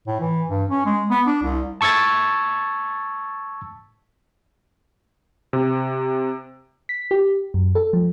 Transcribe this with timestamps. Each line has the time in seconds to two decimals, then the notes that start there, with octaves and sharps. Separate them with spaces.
0.07 A2
0.20 E3
0.49 G2
0.69 C#4
0.86 G#3
1.10 B3
1.27 D4
1.43 C2
1.81 A5 C#6 E6 G#6 A6
5.53 C3
6.89 B6
7.11 G4
7.54 F#2
7.75 A4
7.93 F3